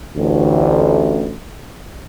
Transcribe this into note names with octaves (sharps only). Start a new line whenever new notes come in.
A1 D2